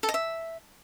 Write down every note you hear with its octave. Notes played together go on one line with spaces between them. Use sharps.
A4
D#5
E5